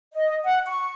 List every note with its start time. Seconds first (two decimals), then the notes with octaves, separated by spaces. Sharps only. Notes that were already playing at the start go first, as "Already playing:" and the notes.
0.14 D#5
0.44 F#5
0.66 C#6